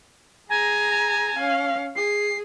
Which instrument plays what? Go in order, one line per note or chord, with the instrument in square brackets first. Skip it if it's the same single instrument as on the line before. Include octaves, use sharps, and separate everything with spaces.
[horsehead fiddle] G#4 A#5 [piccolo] G#5
[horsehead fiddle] C#4 F5
[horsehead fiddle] G#4 [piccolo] C7